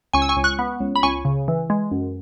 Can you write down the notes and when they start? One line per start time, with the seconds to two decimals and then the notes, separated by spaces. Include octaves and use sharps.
0.13 C#2 G#5 C#6
0.22 E6
0.29 G#5 C#6
0.37 C#2
0.44 C#6 F#6
0.59 B3
0.80 C#2
0.96 B5
1.03 C#2 G#5 C#6
1.25 C#3
1.48 E3
1.70 G#3
1.91 F#2